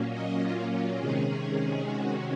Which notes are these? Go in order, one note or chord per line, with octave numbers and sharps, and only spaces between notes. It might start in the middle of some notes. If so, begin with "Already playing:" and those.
Already playing: A#2 F#3 A#3 C#4
D#5
F4
F4
C3 D#3 G#3 C#4 G#4
F#4